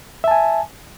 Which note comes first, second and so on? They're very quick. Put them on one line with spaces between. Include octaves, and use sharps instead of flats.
E5 A5 G#5